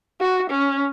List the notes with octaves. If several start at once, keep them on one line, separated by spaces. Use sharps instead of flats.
F#4
C#4